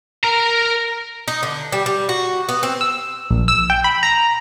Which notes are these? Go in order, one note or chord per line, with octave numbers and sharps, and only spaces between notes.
A#4 A#5
D#4
D3
G3
G3
F#4
B3
C4
E6
A#1
E6
G5
B5
A#5